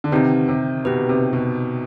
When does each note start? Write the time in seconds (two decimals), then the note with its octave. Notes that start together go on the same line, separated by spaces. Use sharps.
0.04 D3
0.12 C3 D#3 C4 G4 B4
0.48 C3
0.85 B2 C4 G4 B4
1.09 C3
1.33 B2